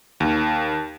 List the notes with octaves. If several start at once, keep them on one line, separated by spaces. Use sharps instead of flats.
D#2